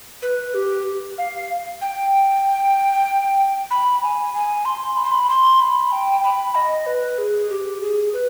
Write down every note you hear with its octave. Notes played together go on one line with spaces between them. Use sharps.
B4
G4
F5
G5
B5
G#5
G#5
C6
B5
C6
B5
C6
B5
G5
B5
D#5
B4
G#4
G4
G#4
B4